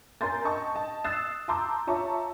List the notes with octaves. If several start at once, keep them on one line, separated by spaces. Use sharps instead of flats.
A#4 G#5 A#5 C6 G6 A6
D#5 G5 A5 C#6
D#5 A5
D#6 E6 F#6 A6 C7 E7
A5 A#5 C6 D6 E6 G6
F4 C#5 E5 A5 A#5 C#6